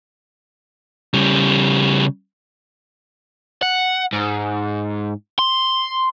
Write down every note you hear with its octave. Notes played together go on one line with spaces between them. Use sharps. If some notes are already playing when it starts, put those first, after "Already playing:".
C#3 G3
F#5
G#2
C6